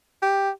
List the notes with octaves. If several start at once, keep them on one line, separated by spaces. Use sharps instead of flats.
G4